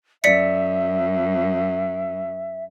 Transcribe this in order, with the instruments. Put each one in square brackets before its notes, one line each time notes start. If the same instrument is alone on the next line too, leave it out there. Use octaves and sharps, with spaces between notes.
[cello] F#2 [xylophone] D5 B6 C#7 [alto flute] E5